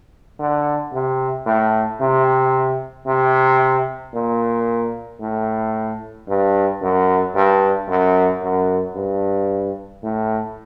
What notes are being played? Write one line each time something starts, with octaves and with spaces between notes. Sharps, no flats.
D3
C3
A2
C3
C3
A#2
A2
G2
F#2
G2
F#2
F#2
G2
A2